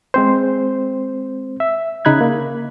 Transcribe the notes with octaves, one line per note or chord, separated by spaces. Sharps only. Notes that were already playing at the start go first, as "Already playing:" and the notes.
G#3 C4 C5
E5
C#3 D#4 B5 F#6 G#6
A#3